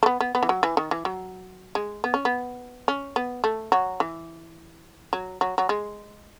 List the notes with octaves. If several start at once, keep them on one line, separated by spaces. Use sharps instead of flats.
A3
B3
B3
B3
E3
F#3
E3
D#3
E3
F#3
G#3
B3
C#4
B3
C#4
B3
A3
F#3
E3
F#3
F#3
F#3
G#3